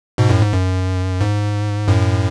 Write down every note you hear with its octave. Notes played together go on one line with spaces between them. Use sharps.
G#2 B2
F#2 A2
G#2
F#2
G#2
F#2 A2